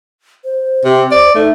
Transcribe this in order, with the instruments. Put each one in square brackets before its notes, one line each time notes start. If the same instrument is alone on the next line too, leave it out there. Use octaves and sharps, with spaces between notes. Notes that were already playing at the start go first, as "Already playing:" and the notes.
[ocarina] C5
[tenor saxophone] C3
D5
[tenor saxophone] A3 [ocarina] D#4